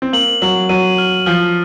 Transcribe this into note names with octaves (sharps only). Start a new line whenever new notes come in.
C4
A#3 F#7
F#3 F#7
F#3 D#7
F6
F3 F6